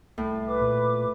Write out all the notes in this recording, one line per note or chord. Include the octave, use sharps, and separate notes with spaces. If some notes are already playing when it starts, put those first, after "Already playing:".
C2 A2
B4 D6
A#2